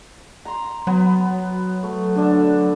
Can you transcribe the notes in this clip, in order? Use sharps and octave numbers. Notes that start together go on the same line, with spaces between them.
A#5 C6
F#3 B3
A3
D3 D4 A4